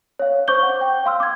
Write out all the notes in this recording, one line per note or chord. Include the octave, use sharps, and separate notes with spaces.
C#5 F5
C5 C#6 D6 G6 G7
F#5
G5
F5 C6 E6 F6
D6 G#6